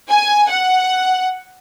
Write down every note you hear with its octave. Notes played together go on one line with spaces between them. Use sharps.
G#5
F#5